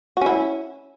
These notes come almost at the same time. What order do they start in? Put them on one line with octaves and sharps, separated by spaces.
F#4 C#4 E4